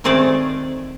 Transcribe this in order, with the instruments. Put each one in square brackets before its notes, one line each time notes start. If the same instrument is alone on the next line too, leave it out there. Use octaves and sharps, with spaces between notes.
[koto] D#3 A3 C4 G#4 A4 D5